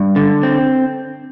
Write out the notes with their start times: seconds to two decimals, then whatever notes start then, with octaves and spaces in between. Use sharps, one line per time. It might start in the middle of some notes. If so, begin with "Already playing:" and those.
Already playing: G2
0.16 D3
0.43 C4